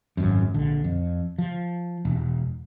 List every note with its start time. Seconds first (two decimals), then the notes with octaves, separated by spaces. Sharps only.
0.17 G#1 F#2
0.54 A#1 D3
0.84 F2
1.38 F3
2.05 E1